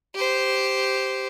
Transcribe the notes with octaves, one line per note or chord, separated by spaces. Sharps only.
G4 C5